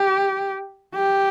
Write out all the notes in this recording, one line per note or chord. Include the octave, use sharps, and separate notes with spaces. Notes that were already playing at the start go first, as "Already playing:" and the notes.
Already playing: G4
G4